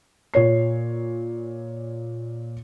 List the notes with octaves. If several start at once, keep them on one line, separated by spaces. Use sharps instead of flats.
A#2 C#5 C7